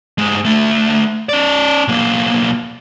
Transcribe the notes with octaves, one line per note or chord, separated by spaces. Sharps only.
G2 G#3
D3 A3
C#4 D5
B1 A#3